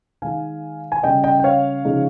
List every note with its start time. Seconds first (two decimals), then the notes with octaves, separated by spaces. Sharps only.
0.22 D#3 G#3 D#4 F5 G#5
0.92 G#5
1.03 C#3 G3 C#4 D#5 G5
1.24 D#5 G5
1.40 G5
1.44 C#5 F5
1.85 C#3 F3 G#3 D#4